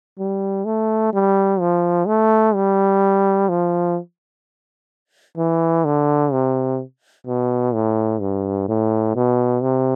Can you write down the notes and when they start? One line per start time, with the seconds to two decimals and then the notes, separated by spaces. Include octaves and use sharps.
0.19 G3
0.65 A3
1.13 G3
1.60 F3
2.07 A3
2.54 G3
3.49 F3
5.38 E3
5.85 D3
6.32 C3
7.27 B2
7.74 A2
8.21 G2
8.68 A2
9.16 B2
9.62 C3